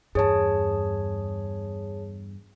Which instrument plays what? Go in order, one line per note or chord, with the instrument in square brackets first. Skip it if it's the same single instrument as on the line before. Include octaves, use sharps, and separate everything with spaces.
[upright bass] E2 G2 [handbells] G#4 C#5 A5